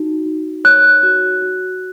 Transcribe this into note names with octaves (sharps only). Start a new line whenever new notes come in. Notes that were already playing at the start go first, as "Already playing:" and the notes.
Already playing: D#4 F#4
D#4
C#5 F#6
F#4
F#4